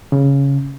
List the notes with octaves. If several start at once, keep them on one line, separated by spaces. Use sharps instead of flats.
C#3